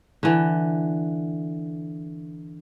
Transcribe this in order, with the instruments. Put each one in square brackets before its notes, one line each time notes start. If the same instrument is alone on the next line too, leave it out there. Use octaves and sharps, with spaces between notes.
[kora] D3 E3